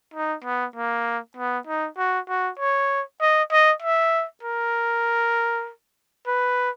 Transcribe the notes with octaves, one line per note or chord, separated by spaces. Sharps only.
D#4
B3
A#3
B3
D#4
F#4
F#4
C#5
D#5
D#5
E5
A#4
B4